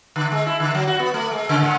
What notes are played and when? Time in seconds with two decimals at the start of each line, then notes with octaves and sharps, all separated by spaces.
0.16 D3
0.32 G#3
0.46 E4
0.60 D3
0.74 F#3
0.87 F#4
0.99 B3
1.14 A3
1.31 G#3
1.49 C#3
1.62 G#2